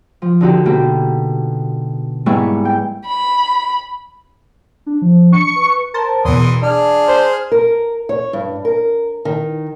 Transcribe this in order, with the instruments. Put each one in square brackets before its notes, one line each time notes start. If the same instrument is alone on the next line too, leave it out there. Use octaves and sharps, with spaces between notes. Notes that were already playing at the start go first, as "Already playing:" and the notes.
[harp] F3
D3 D#4 F#4 G4
B2 A#3 G4 G5
G#2 G3 A#3 B3 E4 C#6
G5
[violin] B5
[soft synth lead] D4
F3
[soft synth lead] D4 [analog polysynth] C#6 C#7
[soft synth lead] B4
[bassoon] A#4 [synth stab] C5 A5
[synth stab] E2 B2 [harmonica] E3 C6 D#6
[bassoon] D4 [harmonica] G#4 F6
[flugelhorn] C5
[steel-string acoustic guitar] A#4
C#5
G2
A#4
D#3